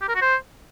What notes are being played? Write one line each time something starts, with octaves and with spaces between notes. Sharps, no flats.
G4
A#4
F#4
C5